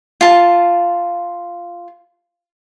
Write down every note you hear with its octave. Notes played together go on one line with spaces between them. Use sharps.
F4 A5